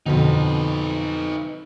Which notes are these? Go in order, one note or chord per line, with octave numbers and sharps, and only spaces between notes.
F2 B2 D3 B3 C4 D#4 B4